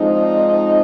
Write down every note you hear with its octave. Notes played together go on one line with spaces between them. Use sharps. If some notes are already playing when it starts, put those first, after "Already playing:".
Already playing: F3 G#3 C4 D#4
D5
C5